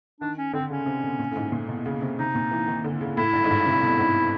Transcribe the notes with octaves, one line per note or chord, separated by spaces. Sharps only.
D#3 D4
C#4
D3 C4
C#3 C#4
C3
B2
A#2
A2
G#2
A#2
B2
C#3
C3
C3 D#4
A#2
E3
D#3
D3
C#3
A2 E4
G2
G#2
G2
C3
B2
G#2